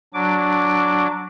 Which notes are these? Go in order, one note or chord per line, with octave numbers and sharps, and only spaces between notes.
F#3 D4 D6